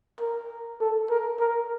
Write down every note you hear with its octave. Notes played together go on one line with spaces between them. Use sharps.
A#4
A4
A#4
A#4